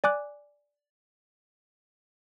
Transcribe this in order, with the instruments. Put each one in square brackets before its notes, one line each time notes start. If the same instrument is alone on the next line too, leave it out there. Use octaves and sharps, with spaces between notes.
[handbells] D5 G#5 D6 F#6